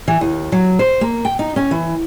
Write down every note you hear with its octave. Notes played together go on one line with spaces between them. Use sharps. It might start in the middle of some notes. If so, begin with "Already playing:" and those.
E3
D#2
F#3
C5
A#3
G5
D#4
C#4
E3